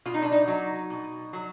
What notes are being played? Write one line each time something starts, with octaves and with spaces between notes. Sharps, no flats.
B2 F4
D#4
D4
D#4
F#3
B2
F#3